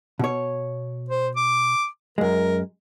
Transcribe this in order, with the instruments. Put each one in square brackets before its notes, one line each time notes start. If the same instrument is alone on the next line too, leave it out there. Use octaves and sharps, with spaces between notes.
[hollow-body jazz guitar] B2 C#5
[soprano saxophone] C5
D6
[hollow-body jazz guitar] F#2 G#3 [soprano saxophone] A#4